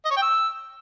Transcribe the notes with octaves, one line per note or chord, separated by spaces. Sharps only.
D#5
C#5
G5
E6